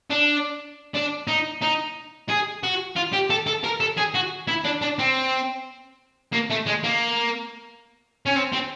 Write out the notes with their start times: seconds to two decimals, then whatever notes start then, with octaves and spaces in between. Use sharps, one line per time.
0.10 D4
0.95 D4
1.28 D#4
1.62 D#4
2.29 G#4
2.63 F#4
2.96 F4
3.13 G4
3.30 A4
3.47 A4
3.64 A#4
3.80 A4
3.98 G#4
4.15 F#4
4.48 E4
4.65 D4
4.82 D4
4.99 C4
6.33 A#3
6.51 A3
6.67 G#3
6.84 A#3
8.26 C#4
8.36 C4
8.53 C4